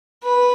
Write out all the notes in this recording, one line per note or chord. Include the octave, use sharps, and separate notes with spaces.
B4